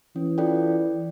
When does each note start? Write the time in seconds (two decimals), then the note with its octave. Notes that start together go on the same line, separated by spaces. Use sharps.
0.16 E3 C#4
0.38 F4 A4 D5 G5